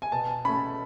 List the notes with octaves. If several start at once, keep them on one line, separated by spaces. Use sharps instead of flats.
G#5
B2 A5
A3 C#4 B5